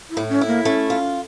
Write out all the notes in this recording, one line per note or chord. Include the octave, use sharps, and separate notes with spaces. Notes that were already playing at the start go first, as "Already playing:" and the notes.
E4
A2
C#4
E4
A#3
A3 C#4
F4